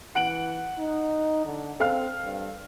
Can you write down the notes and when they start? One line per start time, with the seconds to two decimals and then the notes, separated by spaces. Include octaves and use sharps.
0.15 E3 F#5 D7 F#7
0.78 D#4
1.46 D3
1.80 C4 A4 F5 F6
2.23 G2